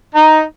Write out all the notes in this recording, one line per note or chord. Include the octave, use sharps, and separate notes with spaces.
D#4